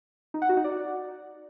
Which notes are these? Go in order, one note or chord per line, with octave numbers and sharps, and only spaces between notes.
D#4
F#5
F#4
D#4
D5